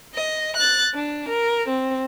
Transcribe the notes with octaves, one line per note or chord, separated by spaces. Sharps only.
D#5
F#6 A6
D4
A#4
C4